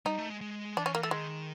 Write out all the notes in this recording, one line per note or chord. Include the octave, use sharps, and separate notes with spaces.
G3 D#4
A3
G#3
G#3
E3 D4
C#4
A#3
A3
D#3 G#3